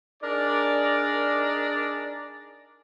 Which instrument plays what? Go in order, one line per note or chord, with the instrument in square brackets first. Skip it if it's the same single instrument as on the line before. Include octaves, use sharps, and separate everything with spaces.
[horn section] D4 D#4 G#4 A#4 D5